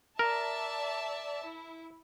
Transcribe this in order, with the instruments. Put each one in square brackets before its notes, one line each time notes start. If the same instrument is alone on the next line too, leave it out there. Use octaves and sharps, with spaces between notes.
[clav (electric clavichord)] A#4 [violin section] D5 E5 A5
[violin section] E4